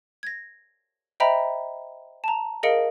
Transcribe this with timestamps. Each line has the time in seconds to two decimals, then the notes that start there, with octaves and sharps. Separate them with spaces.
0.23 G#6 A#6
1.20 C5 D#5 E5 G5 A#5 B5
2.24 A5 A#5
2.63 G#4 A#4 D#5 F5 C#7 D7